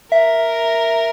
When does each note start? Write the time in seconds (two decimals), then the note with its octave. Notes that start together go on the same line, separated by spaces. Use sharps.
0.12 A#4 E5